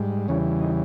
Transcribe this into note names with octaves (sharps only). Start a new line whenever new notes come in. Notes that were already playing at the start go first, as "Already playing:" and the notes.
Already playing: G#2 G3
E2 C#3 E3 G3 C#4
D#4